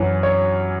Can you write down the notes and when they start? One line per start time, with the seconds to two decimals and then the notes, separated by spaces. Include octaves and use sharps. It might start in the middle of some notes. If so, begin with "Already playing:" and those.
Already playing: F#2 E3 C#4
0.23 C#5